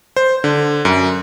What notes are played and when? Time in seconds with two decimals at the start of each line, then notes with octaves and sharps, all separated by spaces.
0.16 C5
0.44 D3
0.85 F#2